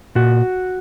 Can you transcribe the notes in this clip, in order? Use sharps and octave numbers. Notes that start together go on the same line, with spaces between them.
A#2 F#4